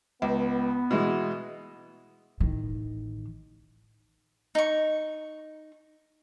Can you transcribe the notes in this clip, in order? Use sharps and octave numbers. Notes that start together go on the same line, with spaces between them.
C#2 B3
B2 E3 G#3
A1 D#3
D#4 C#6